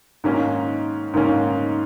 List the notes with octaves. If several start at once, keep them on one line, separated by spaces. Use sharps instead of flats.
G#2 D#3 A#3 C#4
G#2 D#3 A#3 C#4